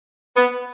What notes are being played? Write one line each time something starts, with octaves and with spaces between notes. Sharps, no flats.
B3